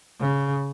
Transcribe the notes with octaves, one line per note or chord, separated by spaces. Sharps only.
C#3